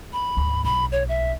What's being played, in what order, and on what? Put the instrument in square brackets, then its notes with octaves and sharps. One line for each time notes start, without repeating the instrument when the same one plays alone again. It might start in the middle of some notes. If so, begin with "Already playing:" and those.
[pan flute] B5
[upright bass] D2 G#2
[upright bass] B1 [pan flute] B5
[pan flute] C#5
E5